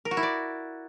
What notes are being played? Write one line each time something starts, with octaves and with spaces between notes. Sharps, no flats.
A#4
F#4
E4
D5